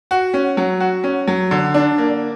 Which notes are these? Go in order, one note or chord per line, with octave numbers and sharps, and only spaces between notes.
F#4
C#4
F#3
F#4
C#4
F#3
D3
D4
A#3